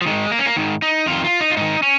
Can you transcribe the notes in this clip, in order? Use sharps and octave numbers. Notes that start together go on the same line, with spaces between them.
F3
G#2 D#3 G#3
A#3
C#4
A#3
G#2 D#3
D#4
F2 D#3 F4
F4
D#4
F4
G#2 D#3 D#4
C#4